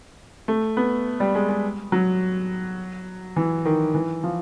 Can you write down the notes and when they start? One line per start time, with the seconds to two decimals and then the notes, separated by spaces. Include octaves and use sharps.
0.48 A3
0.77 B3
1.20 G3
1.35 G#3
1.49 G#3
1.92 F#3
3.36 E3
3.65 D#3
3.95 E3
4.24 F3